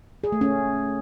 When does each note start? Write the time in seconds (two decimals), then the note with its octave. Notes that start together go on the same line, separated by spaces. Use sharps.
0.24 G#4
0.32 A3
0.41 C#4